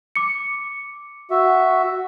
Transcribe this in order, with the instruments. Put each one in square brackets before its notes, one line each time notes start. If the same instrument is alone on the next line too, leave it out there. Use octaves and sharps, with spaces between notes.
[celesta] D6 C#7
[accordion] F#4 E5